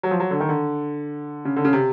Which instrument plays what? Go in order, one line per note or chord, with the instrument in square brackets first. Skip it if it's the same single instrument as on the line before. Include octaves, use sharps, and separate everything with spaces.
[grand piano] F#3
F3
F#3
D3
D#3
D3
C#3
D3
C#3
C3